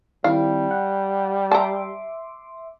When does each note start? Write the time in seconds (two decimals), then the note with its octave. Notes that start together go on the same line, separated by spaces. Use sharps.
0.24 D#3 G3 C4 E4 F5
0.71 F#5
1.51 E5 A5 A#5 C6 D6